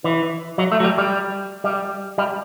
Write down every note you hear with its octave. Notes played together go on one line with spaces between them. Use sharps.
E3
F#3
A3
F#3
G3
G3
G3
G3